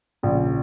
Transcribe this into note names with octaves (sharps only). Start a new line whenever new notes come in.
A#1 C#3 C#4